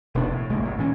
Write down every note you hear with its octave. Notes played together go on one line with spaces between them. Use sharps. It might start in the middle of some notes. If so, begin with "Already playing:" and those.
E1 B2 B3 D4
A2
C2 G#3 A#3
G#1 A2
A#2 E3 C#4